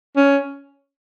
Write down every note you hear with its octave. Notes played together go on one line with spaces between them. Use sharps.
C#4